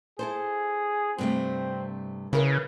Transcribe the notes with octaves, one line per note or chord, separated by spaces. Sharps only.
E4 G#4 A4 C5
G2 C3 A3 C4
C#3 E4 A#4 B4 C#5